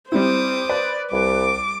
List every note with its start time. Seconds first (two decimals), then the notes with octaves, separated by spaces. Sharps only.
0.12 G3 C4 E4 C5 D6 D#6
0.69 B4 D5
1.12 C2 G3 D6